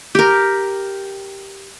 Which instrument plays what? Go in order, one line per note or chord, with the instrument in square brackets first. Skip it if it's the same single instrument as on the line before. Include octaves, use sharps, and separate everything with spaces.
[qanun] G4 A#4